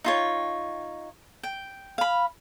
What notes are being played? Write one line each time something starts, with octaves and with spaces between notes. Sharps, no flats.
D#4 F4 C#5
G5
F5 B5